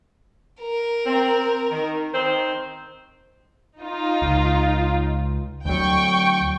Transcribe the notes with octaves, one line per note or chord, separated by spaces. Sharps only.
A#4
C4
D#3
D#3 C4 C5
D#4 F4
C#2
D2 F#3 G5 C#6